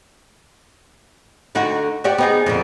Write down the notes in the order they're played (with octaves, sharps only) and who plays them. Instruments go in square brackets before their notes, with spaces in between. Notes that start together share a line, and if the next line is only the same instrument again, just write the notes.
[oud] D3 D#4 F#4
F#4 G4 D5
B3 D#4 G#4
F2 A#2 D3